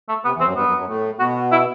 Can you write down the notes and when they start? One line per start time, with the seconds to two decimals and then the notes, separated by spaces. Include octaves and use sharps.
0.09 A3
0.25 C3 B3
0.35 E2 E3
0.40 C4
0.46 F#2 F#3
0.56 G2 G3 B3
0.67 F#2 F#3
0.77 F#2 F#3
0.88 A2 A3
1.20 B2 B3 F#4
1.52 E4